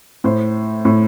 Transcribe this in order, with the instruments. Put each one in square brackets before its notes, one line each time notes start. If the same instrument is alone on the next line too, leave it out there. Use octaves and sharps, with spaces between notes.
[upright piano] A2 C5
A2